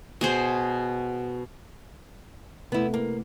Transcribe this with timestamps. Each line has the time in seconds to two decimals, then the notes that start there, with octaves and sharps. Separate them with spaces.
0.21 B2 G#4 C5
2.72 C3 A3 B3 E4
2.94 A#3